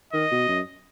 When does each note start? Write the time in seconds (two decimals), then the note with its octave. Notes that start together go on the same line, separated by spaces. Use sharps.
0.13 D#3 D#5
0.31 B2
0.48 F#2